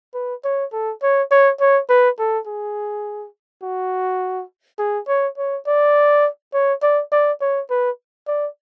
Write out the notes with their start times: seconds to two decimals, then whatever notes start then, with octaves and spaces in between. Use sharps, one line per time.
0.14 B4
0.45 C#5
0.72 A4
1.02 C#5
1.31 C#5
1.60 C#5
1.89 B4
2.19 A4
2.46 G#4
3.63 F#4
4.79 G#4
5.08 C#5
5.38 C#5
5.67 D5
6.53 C#5
6.82 D5
7.12 D5
7.41 C#5
7.70 B4
8.27 D5